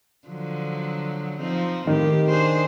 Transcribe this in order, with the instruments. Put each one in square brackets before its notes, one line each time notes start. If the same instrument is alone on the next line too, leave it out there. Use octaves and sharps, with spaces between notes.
[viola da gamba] D3 F3 F#3
F3 C4 D#4
[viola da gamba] A2 G4 [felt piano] D#3
[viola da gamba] D4 G#4 C5